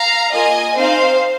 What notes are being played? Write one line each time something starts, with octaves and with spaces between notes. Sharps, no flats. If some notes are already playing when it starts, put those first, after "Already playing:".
Already playing: F5 A#5
A#3 F4 G#4 D#5 G#5
C4 D#4 G#4 C5 F5